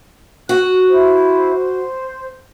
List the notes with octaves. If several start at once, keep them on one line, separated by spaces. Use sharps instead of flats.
F#4 F#6
E4 C5
C5